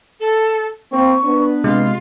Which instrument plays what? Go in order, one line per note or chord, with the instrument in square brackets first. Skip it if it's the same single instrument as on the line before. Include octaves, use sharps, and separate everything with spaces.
[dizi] A4
[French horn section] A#3 C4 C5 [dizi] C#6
[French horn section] B3 D4 B4
[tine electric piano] C3 G#3 [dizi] F4